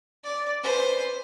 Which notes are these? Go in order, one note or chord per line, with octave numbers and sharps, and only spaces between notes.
D5
B4 C5